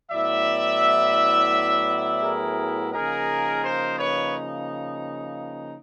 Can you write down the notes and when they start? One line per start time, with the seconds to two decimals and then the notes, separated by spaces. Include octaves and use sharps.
0.10 A2 F#3 B3 E4 D5 E5
2.22 G#4 A#4
2.92 C#3 F3 A#3 D#4 G#4 A#4
3.62 A#4 C5
3.99 B4 C#5